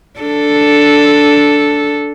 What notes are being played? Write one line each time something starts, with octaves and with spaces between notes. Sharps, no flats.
D4 A4